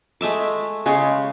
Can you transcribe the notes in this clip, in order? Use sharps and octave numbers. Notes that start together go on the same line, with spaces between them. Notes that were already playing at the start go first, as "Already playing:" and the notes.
G#3 A3 E5 D6
C#3 G#3 C6